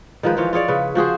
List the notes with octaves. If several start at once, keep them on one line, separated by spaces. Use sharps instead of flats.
D#3 F3 G#3 B4
E3 F3 F4 C#5
F4 G#4 C#5 D5
C#3 B4
F3 F#4 G#4 C5